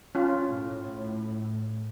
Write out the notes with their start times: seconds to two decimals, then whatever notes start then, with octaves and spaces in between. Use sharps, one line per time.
0.15 C#4 F4
0.49 A2